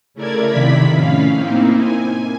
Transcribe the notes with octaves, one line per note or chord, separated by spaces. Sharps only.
C#3 A3 E4 A#4 D5 G#6
C3 D#3 F3 E4 B5 B6
A2 C#4 F5
A#3 C4 D#4 E4
G#5